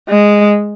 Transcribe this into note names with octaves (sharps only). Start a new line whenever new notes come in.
G#3